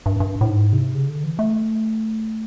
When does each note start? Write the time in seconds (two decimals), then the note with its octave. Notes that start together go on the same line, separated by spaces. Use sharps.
0.06 G2
0.20 G2
0.41 A2
0.50 G#2
0.73 C3
0.94 C#3
1.09 D3
1.24 E3
1.39 A3